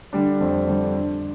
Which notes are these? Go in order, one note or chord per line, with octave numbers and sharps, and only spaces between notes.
D3 G3 D4
F2
D3 G3 D4
D3